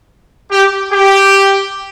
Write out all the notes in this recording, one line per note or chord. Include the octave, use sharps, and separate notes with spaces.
G4
G4